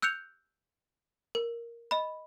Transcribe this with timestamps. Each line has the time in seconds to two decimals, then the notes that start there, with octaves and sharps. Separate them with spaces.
0.02 E6 F#6 G6 C#7 F7
1.35 A#4
1.91 D#5 B5